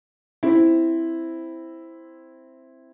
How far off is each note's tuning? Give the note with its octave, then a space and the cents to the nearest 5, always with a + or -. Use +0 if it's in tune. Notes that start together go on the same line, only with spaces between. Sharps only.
C4 +0 E4 +0